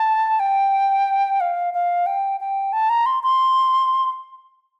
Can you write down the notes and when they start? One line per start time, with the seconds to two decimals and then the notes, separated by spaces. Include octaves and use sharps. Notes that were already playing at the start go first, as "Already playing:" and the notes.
Already playing: A5
0.40 G5
1.40 F5
1.74 F5
2.06 G5
2.40 G5
2.73 A5
2.89 A#5
3.06 C6
3.23 C6